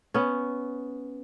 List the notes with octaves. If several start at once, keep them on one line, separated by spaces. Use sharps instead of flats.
B3 C#4